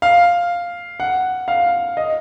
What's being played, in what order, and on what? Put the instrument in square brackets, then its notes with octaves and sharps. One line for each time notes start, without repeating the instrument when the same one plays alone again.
[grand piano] F5
F#5
F5
D#5